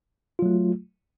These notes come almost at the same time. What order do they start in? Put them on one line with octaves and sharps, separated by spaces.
F4 F#3 A3